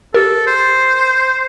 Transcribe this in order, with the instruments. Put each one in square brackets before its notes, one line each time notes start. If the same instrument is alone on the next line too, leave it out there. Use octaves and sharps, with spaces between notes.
[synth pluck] G4 A#4 [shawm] A4
[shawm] C5